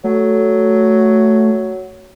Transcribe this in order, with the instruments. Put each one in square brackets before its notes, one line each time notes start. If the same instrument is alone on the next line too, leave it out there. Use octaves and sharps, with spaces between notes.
[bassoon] F#3 [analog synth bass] A3